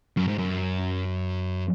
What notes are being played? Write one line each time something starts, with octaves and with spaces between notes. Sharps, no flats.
F#2
G#2
F#2